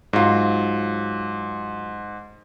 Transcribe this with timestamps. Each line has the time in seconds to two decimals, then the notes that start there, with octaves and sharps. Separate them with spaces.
0.13 G#2 F#3 F4